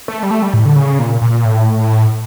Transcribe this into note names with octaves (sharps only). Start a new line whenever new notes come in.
A3
G3
A3
G3
A2
D3
C#3
A#2
A#2
A2